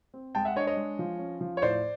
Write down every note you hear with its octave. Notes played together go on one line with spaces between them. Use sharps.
C4
G#3 G5 A5
E5 F#5
D4 C#5 D#5
C#5 D#5
G#3
F3
C#4
F3
C#5
A2 C5 D5